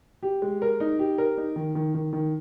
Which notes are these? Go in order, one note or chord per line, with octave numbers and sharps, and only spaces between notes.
G4
G#3
A#4
D#4
G4
A#4
D#4
D#3
D#3
D#3
D#3